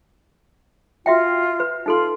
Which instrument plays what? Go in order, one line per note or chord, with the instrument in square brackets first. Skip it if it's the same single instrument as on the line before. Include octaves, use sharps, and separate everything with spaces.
[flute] F4 [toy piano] F#4 E5 G5
[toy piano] B4
[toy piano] D#4 A4 C6 [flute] F4